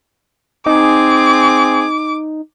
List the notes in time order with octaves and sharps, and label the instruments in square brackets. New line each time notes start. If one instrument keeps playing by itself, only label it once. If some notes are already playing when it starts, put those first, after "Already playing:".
[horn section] C4 G#4 [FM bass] D#4 [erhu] D6